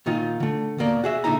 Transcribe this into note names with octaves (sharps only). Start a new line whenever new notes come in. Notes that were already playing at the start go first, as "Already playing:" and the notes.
A#2 D#3 D#4 F4
D3 A3
D#2 B2 A#3 D5
F#4 G#4 E5
A#2 D3 D#4 E4 A#5